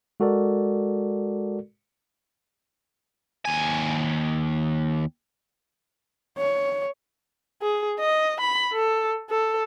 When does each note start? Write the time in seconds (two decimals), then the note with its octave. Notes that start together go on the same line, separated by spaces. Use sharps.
0.20 G#3 F#4 A4 A#4 D5
3.45 D#2 G#5
6.38 C#5
7.62 G#4
7.99 D#5
8.40 B5
8.73 A4
9.29 A4